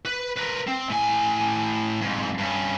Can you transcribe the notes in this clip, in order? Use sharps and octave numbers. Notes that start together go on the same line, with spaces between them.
B4
A#4 B4
C4
A2 G#5
F2 G#2
G2 C#4